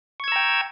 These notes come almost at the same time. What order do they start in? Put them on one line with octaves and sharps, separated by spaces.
C#6 G#6 E6 A#5 G5